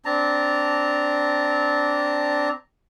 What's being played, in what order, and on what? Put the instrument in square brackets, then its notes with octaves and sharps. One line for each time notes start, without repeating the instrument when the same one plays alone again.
[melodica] C4 D4 A5 A#5